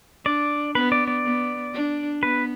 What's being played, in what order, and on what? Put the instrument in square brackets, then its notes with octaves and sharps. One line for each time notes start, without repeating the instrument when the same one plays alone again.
[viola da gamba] D4 [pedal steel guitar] D5
[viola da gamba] B3 [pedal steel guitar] B4
[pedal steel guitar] D5
D5
[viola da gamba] B3
D4
[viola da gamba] B3 [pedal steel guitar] B4